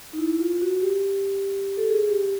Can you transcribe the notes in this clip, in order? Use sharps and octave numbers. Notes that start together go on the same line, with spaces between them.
D#4
E4
F4
F#4
G4
A4
G#4
G4